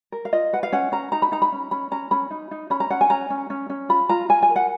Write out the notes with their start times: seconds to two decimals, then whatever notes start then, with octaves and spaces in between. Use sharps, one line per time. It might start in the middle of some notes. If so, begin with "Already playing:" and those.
0.12 A#4
0.25 F5
0.33 F4 D#5
0.53 B4 F#5
0.63 F5
0.72 C#4 F#5
0.92 C#4 A#5
1.12 D#4 A#5
1.22 B5
1.32 D#4 A#5
1.42 B5
1.52 C#4
1.71 C#4 B5
1.91 C#4 A#5
2.11 C#4 B5
2.31 D#4
2.51 D#4
2.70 C#4 B5
2.80 A#5
2.90 C#4 F#5
3.01 G#5
3.10 C#4 A#5
3.30 C#4
3.50 C#4
3.70 C#4
3.89 F4 B5
4.09 F4 A#5
4.29 F4 G#5
4.43 G#5
4.49 A#4
4.56 F#5